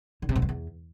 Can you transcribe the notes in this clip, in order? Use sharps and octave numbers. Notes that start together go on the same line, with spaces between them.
D3
C3
G#2
F2
E2